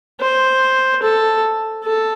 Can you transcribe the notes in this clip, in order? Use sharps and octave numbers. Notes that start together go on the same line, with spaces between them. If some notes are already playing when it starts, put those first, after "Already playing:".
C5
A4
A4